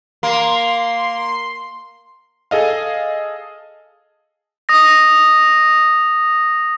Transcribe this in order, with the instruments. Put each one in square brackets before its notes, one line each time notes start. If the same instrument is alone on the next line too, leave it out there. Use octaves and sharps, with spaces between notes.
[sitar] A#3 [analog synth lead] C6
[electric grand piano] G#4 A4 D#5 F5
[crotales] D#6 A#6